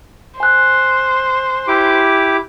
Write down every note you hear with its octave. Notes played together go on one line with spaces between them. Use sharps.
C5 G#5 F#6
E4 G4 D6